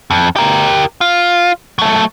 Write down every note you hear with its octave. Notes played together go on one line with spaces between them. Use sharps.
F2
G4 A#4
F4
F#3 A3